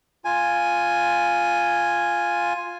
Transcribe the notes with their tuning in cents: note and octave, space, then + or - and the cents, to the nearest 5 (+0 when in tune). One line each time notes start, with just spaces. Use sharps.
F4 +0 G#5 +0